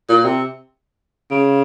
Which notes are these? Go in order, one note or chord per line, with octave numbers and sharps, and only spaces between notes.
A#2
C3
C#3